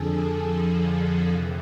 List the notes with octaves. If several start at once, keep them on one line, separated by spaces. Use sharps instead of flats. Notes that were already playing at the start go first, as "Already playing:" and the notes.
Already playing: F2 D3 F3 G#4 A4
A4
F2 C3 E3